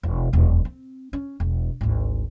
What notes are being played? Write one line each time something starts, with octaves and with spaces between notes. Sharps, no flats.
E1
D#1 F2
C4
C#4
E1
G#1 D2